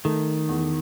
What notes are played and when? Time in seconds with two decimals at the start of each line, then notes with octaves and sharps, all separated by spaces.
0.05 D#3 A3
0.49 E2